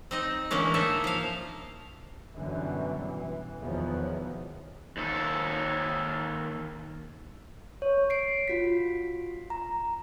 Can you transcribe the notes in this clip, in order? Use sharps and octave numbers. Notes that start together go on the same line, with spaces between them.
C4 D#4 D#5
D3 E3 G#3 A#3 C#4
A#3 D#4 A4 E5 G#5
F3 F5
F#2 B2 D3 E3 F#3 G3
E3
E2 B2 D#3 F3 F#3 B3
D#2 A4
C#5
C7 D7
F4 F#4 B6
A#5